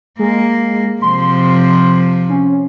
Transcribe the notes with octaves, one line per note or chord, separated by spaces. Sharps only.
G#3 A#3
C3 F3 C6
C#4